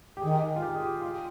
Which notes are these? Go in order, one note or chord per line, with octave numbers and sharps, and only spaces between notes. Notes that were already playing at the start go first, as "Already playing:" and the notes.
G4
D#3 G#4
F4
G4
G#4
G4
F4